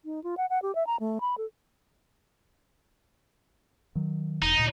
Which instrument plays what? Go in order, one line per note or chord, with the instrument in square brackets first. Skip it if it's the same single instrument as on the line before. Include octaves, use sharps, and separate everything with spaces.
[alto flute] D#4
F4
F#5
F#5
G4
E5
A#5
A3
B5
A4
[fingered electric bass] D#3 F#3
[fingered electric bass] E1 [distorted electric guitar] D#4
[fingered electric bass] D2 A#2